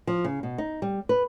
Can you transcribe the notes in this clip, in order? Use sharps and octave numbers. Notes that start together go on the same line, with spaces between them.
F3
C#3
B2
D#4
G3
B4